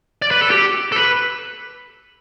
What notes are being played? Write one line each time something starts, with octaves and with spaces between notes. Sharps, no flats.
D5
B4
A4
G4
A4
B4